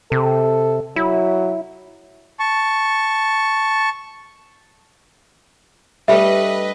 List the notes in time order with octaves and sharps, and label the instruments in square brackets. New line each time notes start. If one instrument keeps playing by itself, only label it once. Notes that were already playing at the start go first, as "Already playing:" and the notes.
[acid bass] C3 [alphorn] A4
[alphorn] F#3 [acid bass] E4
[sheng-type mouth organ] A5 C#6
[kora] G2 G3 A3 [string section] B4 D#5 [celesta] E5